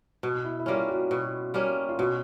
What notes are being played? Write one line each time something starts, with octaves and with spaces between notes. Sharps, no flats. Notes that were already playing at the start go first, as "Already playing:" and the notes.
B2
E4
E4
G3 A#3 C#4 F4
F#4
B2
G3 A#3 C#4
F4
B2 F#4